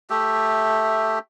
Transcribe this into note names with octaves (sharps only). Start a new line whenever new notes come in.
A3 G4 E5